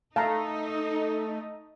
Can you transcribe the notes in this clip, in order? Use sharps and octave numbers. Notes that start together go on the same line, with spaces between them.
A3 D#4 F5 A5 A#5